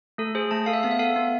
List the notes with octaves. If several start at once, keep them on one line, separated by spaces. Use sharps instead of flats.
A3 A4
G#4 C5
A3 A5
A4 F5
E5
B3 F5
E5
A4 F5
B3